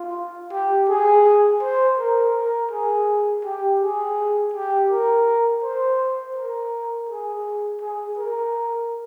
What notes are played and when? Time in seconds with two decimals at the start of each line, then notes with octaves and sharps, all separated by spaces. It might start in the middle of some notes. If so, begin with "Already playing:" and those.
Already playing: F4
0.53 G4
0.89 G#4
1.62 C5
1.98 A#4
2.35 A#4
2.71 G#4
3.45 G4
3.81 G#4
4.54 G4
4.91 A#4
5.63 C5
6.36 A#4
7.09 G#4
7.82 G#4
8.18 A#4